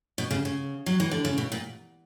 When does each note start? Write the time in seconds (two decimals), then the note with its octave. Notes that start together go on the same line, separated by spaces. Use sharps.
0.18 B2
0.31 C#3
0.45 C#3
0.86 F#3
1.00 E3
1.11 D3
1.25 C#3
1.38 B2
1.52 A#2